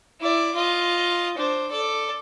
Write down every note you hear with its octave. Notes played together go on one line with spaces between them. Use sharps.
E4 D5
F4 D#5
D4 C5
A4 D5